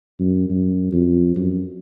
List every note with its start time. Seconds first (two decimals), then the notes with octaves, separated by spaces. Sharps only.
0.20 F#2
0.49 F#2
0.92 F2
1.36 F#2